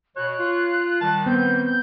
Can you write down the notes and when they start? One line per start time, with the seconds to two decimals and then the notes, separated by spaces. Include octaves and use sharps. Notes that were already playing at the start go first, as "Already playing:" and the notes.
0.16 B2 C#5 F#6
0.39 F4
1.01 D#3 G3 A5
1.26 B3 C4 G6
1.65 G6